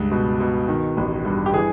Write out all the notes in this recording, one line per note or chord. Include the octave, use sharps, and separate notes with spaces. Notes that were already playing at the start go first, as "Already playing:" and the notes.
Already playing: C#2 G2
B2
B2
D#3
A1
G2
G4
E3 G#4